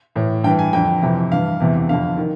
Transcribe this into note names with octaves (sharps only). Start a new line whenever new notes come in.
A2 E3
G2 E3 G5
G#5
F2 D3 G5
F2 C3 E3
G2 E3 F5
E2 C3 E3
F2 D3 F5
D#3